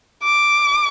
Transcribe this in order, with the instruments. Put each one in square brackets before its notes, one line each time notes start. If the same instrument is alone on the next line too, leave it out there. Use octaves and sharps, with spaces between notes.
[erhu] D6